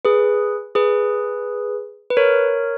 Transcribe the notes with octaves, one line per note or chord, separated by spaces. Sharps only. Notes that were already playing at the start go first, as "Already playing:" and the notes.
G#4 B4
G#4 B4
B4
A#4 C#5